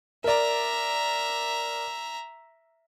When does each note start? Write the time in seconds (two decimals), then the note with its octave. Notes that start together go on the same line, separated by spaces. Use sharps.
0.24 A#4 D5 E5 A#5